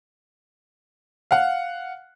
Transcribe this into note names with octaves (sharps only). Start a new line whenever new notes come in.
F5 F#5